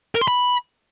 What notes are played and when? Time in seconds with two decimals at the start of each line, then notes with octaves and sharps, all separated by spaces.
0.15 A#4
0.21 C6
0.28 B5